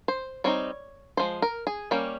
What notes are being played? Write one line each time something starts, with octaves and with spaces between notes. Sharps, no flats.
C5
G3 C4 D#4 C#5
F3 G#3 C5
A#4
G#4
G3 A#3 C#4 G5